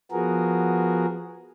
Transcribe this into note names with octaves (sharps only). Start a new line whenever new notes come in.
F3 B3 F#4 G#4 A#4